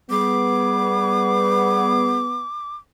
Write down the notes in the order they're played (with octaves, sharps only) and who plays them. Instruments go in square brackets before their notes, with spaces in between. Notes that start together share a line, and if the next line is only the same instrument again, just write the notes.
[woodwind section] G3 G#4 [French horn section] B3 [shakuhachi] D6